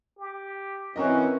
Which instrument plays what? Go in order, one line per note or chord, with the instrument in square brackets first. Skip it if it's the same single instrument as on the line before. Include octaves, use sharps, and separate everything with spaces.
[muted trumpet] G4
[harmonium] E3 C#4 [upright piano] C4 A#4 D#5 [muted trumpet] F#4